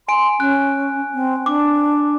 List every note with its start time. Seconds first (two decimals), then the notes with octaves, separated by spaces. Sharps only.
0.08 G#5 C6 D7
0.40 C#4 F#6
1.14 C4
1.46 D4 D6